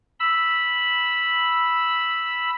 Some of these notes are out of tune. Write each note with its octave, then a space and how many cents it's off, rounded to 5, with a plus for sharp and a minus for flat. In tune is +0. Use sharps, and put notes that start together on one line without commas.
B5 -5 E6 +0